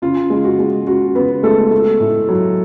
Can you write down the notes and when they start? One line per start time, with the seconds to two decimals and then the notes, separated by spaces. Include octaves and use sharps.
0.02 C#3 F4
0.30 G#3
0.44 F#4
0.59 G#3
0.87 C#3 F#4
1.15 C#3 B3 B4
1.43 G#3 A3 A4
1.71 A3
2.00 A2
2.29 F#3